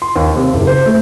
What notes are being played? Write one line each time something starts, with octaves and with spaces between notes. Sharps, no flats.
C6
D#2
C3
F#1
C5
A3